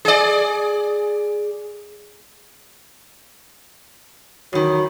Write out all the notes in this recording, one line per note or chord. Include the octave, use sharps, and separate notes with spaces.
G#4 D5
E2 D#3 F#3